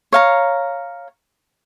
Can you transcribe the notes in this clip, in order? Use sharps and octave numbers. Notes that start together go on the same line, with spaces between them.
C#5 F5 A#5